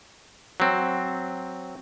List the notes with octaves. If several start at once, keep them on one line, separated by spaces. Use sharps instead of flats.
F#3 C4